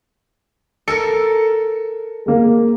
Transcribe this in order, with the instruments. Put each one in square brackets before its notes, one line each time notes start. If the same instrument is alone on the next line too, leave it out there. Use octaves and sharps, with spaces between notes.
[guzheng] A4 A#4 [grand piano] C#7
[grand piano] G#3 A#3